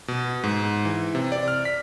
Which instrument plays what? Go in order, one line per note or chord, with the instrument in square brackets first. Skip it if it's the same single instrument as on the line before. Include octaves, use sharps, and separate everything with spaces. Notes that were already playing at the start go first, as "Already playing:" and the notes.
[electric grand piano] B2
G#2
E3
C3
D5
F6
B6